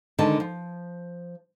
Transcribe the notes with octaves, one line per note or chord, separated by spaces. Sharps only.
D3 D#3 G#3 B4 A5
F3